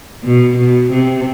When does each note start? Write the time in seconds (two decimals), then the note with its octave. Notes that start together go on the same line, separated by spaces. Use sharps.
0.24 B2
0.57 B2
0.92 C3